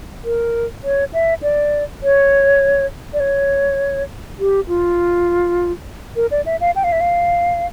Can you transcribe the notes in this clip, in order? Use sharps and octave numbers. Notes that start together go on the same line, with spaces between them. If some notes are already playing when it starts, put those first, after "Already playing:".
A#4
C#5
E5
D5
C#5
D5
C#5
G4
F4
A#4
D5
E5
F5
G5
F5
E5
F5